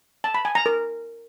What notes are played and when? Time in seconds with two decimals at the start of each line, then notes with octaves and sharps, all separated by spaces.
0.24 A5
0.34 B5
0.45 G#5
0.55 A#5
0.66 A#4